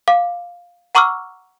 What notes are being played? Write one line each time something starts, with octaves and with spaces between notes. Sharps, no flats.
F5 D6
F#5 A#5 C#6 D6 E6 F6